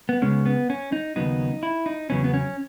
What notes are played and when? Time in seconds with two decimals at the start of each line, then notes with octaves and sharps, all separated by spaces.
0.09 B3
0.22 C#2 C#3 G#3 B3 C#4
0.46 B3
0.70 C#4
0.92 D#4
1.16 D#2 C#3 F#3 B3 D#4
1.63 E4
1.86 D#4
2.10 E2 C#3 F#3 B3 C#4
2.24 B3
2.34 C#4